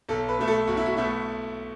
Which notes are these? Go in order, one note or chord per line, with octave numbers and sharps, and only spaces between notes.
B1 A4
B4
B2 A3
A4
B1 F#4
E4
F#4
B2 A3 E4